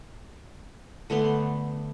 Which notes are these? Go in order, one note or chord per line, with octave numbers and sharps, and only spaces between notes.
D3 A3 B3 C6